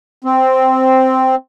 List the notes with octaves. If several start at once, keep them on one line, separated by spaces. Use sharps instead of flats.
C4